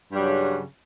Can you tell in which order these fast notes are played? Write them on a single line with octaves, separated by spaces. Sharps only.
G2 G3 F#3 C#3